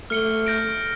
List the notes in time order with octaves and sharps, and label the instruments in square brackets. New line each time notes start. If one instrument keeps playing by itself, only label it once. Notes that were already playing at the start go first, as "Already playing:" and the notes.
[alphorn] A3 [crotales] F6 C#7 G7
[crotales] G6 A#6 D7